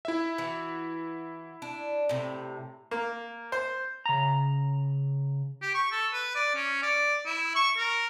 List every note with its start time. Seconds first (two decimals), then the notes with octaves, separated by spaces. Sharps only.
0.05 E4 E5
0.38 E3 F#4
1.62 D4
2.09 A2 C3
2.91 A#3
3.52 C5
4.06 C#3 A#5
5.62 G4
5.74 C#6
5.92 A4
6.13 B4
6.35 D5
6.55 C#4
6.83 D5
7.26 E4
7.56 C#6
7.78 A#4